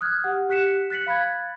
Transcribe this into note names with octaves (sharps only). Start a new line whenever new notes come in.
D#6 F6 F#6 G#6
G4 F#5
G4 F#6 B6 C#7 E7
F#6 A6 B6 C#7 F#7
F5 B5 F#6 G#6 A6